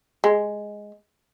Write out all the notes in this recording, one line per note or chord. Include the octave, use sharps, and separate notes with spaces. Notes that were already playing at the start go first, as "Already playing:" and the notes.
G#3